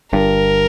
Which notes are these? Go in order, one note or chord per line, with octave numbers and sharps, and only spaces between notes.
G1 G2 A#4